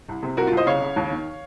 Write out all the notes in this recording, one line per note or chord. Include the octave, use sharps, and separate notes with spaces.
C2
C3
C2 F#4 A#4
C2 F4
C5 D#5
C#3 C#5 F5
C#3
D#2
D#3